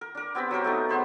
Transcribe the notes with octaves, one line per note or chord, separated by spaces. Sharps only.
A#4
D4 A#4
B3 C4 G4 B5
F#3 G4 A#4 C5
A3 B3 D#4
B3 G#4 C5 B5